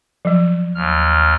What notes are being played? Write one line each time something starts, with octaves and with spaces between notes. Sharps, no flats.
F3 F#3
D#2 F6